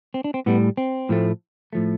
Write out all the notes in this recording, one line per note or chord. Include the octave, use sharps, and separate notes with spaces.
C4
D4
C4
A2 G3 B3
C4
A2 F3 A3
A2 F3 A3